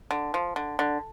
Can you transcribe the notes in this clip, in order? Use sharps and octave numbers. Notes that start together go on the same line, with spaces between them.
D3
F3
D3
D3